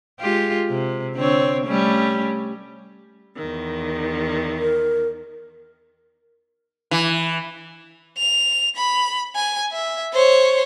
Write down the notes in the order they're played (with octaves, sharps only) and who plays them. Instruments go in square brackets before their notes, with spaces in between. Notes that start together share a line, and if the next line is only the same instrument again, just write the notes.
[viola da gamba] G#3 F4 G4
C3
D3 C4 C#5
G3 A3 C#4
[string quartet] E2 D#3
[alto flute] A#4
[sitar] E3
[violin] F7
B5
G#5
E5
C5 C#5